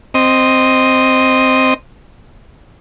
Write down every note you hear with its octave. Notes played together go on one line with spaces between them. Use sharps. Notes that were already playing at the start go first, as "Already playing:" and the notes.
C4 D#5